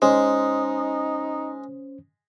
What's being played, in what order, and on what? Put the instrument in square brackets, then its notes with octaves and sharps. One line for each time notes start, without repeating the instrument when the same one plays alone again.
[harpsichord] G#3 [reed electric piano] C#4 C5 [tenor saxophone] D#4